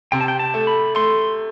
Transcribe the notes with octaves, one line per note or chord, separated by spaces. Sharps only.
C3 G5
A5
G5
A5
A3
B5
A3 C6